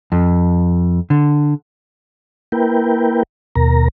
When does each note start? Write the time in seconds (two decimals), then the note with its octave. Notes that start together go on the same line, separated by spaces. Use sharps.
0.12 F2
1.10 D3
2.52 A#3 E4 A#4 B4 G5
3.56 D#2 B2 A#4 A#5